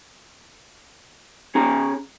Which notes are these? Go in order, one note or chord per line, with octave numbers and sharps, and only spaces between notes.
C#4 G#4 A#5